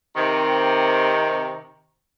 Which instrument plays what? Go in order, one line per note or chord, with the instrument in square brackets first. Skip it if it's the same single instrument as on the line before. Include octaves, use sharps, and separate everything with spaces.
[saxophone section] C3 D#3